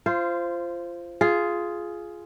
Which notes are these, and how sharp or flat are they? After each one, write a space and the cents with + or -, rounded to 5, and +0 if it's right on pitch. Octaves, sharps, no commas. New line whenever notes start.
F4 -20 C5 +0
F4 -5 G#4 +10